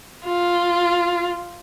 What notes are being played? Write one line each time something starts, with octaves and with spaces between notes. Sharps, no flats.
F4